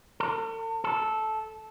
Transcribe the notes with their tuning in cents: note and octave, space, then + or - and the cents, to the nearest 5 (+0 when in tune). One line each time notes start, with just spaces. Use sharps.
A4 +45
A4 -10